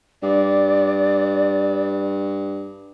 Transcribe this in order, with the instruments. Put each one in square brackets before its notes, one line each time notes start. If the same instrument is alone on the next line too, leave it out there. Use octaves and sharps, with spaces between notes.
[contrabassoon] G2 [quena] D5